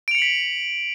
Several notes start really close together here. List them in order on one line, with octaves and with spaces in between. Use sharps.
D7 F7 C#7 F#7 B6